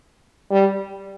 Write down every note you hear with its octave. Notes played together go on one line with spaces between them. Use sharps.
G3